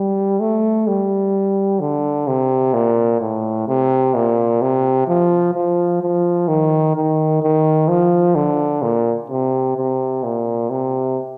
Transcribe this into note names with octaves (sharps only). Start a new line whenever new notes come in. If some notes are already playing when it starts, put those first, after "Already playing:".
Already playing: G3
A3
G3
D3
C3
A#2
A2
C3
A#2
C3
F3
F3
F3
D#3
D#3
D#3
F3
D3
A#2
C3
C3
A#2
C3